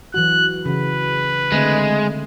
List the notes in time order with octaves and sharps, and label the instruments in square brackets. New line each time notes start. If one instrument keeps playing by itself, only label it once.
[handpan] E3 F#3 F#4 [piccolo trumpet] F#6
[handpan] C#3 E3 F#4 [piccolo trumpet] B4
[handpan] D3 A3 C4 [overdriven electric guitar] G#3